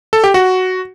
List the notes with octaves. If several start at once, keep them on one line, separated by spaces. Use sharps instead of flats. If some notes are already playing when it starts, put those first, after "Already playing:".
A4
G4
F#4